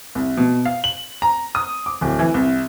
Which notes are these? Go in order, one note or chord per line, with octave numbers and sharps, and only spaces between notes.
C2
B2
F5
F#7
A#5
D#6
D6
D1
E3
C2